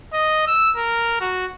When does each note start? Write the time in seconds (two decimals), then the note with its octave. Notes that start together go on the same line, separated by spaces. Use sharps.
0.13 D#5
0.47 E6
0.76 A#4
1.21 F#4